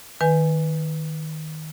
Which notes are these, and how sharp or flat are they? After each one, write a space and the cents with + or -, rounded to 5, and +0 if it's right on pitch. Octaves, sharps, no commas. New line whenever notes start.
D#3 +0 B4 +0 G#5 +0